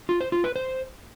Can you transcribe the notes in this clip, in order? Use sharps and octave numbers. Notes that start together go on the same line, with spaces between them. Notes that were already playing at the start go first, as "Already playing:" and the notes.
F4
C5
F4
B4
C5